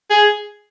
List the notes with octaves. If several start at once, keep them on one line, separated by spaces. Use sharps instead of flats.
G#4